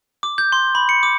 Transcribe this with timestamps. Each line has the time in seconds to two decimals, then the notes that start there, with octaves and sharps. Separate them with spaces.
0.23 D6
0.38 G6
0.52 C6
0.75 B5
0.89 C#7
1.03 D6